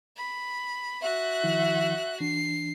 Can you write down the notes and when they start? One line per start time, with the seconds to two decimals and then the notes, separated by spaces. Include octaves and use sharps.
0.17 B5
1.02 F#4 E5 F#6
1.44 D#3 F3 E4
2.20 E3 D4 C7